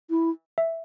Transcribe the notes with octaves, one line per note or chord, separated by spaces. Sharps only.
E4
E5